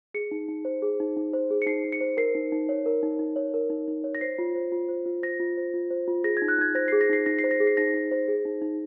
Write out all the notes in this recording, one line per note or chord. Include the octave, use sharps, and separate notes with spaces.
G#4 C#7
D#4
D#4
C5
G#4
D#4
D#4
C5
G#4
C#7
D#4 C7
D#4
C#7
C5
A#4 C7
D#4
D#4
C#5
A#4
D#4
D#4
C#5
A#4
D#4
D#4
C#5
A#6
C5 C7
F4
C5
F4
C5
F4
C5 A#6
F4
C5
F4
C5
F4
G#4 A#6
G#6
D#4
F#6
D#4 G#6
C5 A#6
G#4 C7
A#6
D#4 C7
D#4 A#6
C7
C5
A#6
G#4
C7
D#4 A#6
D#4
C5
G#4
D#4
D#4